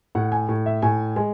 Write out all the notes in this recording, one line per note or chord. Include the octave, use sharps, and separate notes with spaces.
A2 F#5
G#5
A2
E5
A2 G#5
G#3 G#5